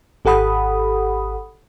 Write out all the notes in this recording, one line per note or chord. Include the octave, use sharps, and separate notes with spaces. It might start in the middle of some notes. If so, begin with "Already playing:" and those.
G#1 G4 A4 F#5 B5 D#6